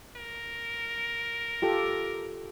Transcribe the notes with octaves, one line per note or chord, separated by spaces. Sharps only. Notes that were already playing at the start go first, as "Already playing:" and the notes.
A#4
F4 G4 A4